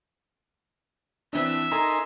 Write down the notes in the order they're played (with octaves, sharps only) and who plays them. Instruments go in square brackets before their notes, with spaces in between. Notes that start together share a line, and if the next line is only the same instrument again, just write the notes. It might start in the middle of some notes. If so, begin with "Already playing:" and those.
[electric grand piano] E3 C4 D4 [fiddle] E5
[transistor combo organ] D#4 A#4 C6 [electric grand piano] A4 G#5 A#5